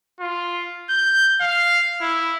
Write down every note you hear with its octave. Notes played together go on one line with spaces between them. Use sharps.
F4
G6
F5
E4